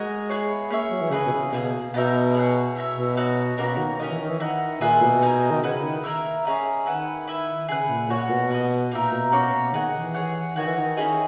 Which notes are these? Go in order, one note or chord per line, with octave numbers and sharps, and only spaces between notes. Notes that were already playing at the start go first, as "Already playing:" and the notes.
Already playing: G#3 F#4 A#4 D#5 G#5
B3 E4 G#4 C#5
A#3 C#4 G#4 C#5 E5
F#3
E3
C#3 E4 G#4 B4 D#5
B2
C#3
B2 A#3 E4 G#4
B2 B3 D#4 A#4 E5
G#4 C#5 F#5
E4 A#4 C#5 E5
B2
D#4 F#4 C#5
B2 A#3 C#4 F#4 A#4
D#3
D#3 C#4 F#4 A#4 D#5
E3
D#3
E3
D#3 E4 A#4 D#5 F#5
A#2 G#4 B4 E5 G#5
B2
D#4 A#4 D#5 G#5
D#3
C#3 E4 B4 F#5
D#3
A#3 E4 A#4 E5
C#4 G#4 D#5
D#3 E4 B4 F#5
E4 B4 E5
C#3 G#4 B4 F#5
A#2
A#2 F#4 C#5 F#5
B2
F#4 A#4 D#5
A#2 A#3 D#4 A#4 E5
B2
B2 A#3 C#4 F#4 C#5
B2
D#3 G#4 D#5 F#5
E3
G#4 C#5 F#5
D#3 F#4 C#5 G#5
E3
D#3
C#4 E4 G#4 D#5